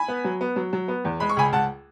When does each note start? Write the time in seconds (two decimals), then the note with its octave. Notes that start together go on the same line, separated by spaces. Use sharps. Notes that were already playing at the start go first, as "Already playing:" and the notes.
Already playing: G#5 B5
0.08 B3
0.24 F#3
0.41 B3
0.56 F#3
0.73 F#3
0.88 B3
1.05 E2
1.20 G#3 B5
1.29 C#6
1.36 C#2 G#5 B5
1.52 C#2 F#5 A5